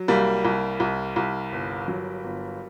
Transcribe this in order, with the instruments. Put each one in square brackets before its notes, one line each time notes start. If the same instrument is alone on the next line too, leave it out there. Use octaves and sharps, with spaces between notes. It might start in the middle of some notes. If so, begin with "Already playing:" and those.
Already playing: [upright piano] F#3
C2 G3 A#3
C2
C2
C2
G1
F#3
G1